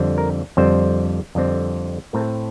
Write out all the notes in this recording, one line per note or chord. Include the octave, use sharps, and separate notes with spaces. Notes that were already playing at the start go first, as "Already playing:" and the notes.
Already playing: F2 D3 G3 C4
A#4
F2 D3 G3 C4 C5
F2 D3 G3 C4
A2 A3 C4 A#4